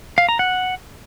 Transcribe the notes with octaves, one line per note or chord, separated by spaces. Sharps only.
F5
A#5
F#5